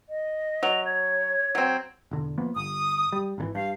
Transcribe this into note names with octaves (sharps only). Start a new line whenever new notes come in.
D#5
F#3 F7
C#5 G#6
F#3 C4
E1 D3
F3 A#3 B3
G1 D#6
G3
G#1 C#3 E3
G2 F5